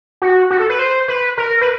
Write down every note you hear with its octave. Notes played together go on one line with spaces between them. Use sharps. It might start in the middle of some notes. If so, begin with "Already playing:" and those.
F#4
F#4
A4
B4
C5
B4
A#4
B4